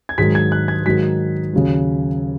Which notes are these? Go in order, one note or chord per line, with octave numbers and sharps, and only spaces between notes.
G#6
G#2 D#3 F#3 B6
G#6
F#6
G#6
G#2 D#3 F#3 B6
D#2 C#3 F#3